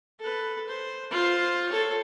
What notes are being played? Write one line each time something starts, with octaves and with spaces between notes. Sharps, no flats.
A4 B4
C5
F4 C5
A4 C#5